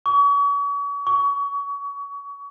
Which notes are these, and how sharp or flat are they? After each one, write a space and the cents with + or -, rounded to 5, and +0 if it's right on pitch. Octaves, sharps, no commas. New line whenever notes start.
C#6 +40
C#6 +30